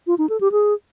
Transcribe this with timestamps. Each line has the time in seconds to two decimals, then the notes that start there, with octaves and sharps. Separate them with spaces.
0.07 F4
0.18 D#4
0.29 A4
0.41 G4
0.52 G#4